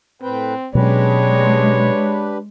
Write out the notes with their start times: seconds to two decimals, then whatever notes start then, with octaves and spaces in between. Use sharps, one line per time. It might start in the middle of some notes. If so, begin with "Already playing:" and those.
0.22 A2 C4 B4 G5
0.75 B2 F#3 G#3 C#4 D4 G4 B4 C#5